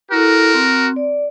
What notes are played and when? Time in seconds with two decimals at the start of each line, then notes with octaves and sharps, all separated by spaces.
0.12 E4 F#4 A4 A#4
0.54 C4
0.96 D5